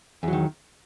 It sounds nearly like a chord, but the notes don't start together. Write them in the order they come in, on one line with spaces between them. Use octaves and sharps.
E2 F#3 D#3